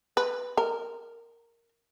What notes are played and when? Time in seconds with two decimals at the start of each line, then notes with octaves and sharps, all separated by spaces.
0.17 B4
0.57 A#4